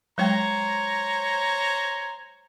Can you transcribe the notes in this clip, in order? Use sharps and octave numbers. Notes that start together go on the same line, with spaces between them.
F#3 G#3 C5 C#5 G5 A#5